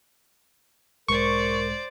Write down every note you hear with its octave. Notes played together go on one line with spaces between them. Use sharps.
B1 G#2 G#3 A#4 C5 D5 C#6